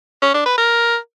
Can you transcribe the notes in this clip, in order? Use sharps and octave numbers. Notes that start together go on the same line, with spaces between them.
C#4
D4
B4
A#4